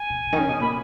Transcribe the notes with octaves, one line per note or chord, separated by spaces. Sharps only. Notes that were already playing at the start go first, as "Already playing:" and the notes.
Already playing: G#5
B2
B2
D#3
C#3
B2
A#2 B5